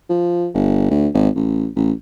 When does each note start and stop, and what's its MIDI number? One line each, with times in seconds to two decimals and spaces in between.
0.09 0.48 53
0.54 0.88 31
0.90 1.08 38
1.14 1.29 32
1.36 1.68 33
1.76 1.92 33